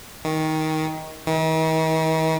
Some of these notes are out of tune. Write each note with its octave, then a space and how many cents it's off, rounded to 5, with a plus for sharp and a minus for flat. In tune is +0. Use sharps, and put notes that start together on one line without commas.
D#3 +15
D#3 +45